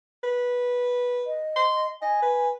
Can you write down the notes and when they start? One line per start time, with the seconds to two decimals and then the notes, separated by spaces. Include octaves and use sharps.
0.23 B4
1.27 D#5
1.56 C6
2.02 D#5 G#5
2.22 B4